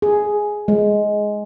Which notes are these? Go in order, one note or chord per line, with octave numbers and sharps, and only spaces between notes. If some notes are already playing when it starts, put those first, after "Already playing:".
G#4
G#3